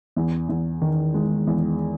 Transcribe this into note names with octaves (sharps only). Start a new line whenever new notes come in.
E2
E2
D#3
G#3
E2